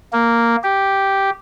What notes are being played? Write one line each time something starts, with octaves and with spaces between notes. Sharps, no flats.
A#3
G4